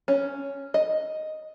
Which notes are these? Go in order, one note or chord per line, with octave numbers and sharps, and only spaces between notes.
C#4
D#5